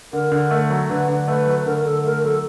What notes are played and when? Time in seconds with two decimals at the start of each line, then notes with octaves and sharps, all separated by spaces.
0.13 D3 A#4
0.32 D3
0.51 A3
0.70 F#3
0.90 D3 B4
1.08 D3
1.28 A3 B4
1.47 F#3
1.66 D3 A#4
1.85 D3 A4
2.04 A3 A#4
2.24 F#3 A4